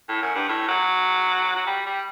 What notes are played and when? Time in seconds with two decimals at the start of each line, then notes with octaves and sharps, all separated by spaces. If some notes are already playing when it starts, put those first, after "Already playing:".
0.09 A2
0.22 F#2
0.35 G2
0.48 A2
0.68 F#3
1.56 F#3
1.66 G3
1.86 G3